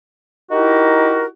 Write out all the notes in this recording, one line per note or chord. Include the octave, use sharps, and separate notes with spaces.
D#4 E4 F#4 G4 A#4